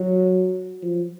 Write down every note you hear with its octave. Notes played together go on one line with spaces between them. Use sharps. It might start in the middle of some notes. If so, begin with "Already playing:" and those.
Already playing: F#3
F3